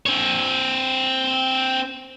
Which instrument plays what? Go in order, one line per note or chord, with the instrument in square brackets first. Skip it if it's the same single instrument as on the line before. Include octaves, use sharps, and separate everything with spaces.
[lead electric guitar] C4 C#5